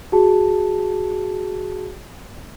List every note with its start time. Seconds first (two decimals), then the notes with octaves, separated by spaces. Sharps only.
0.12 F#4 G#4 A5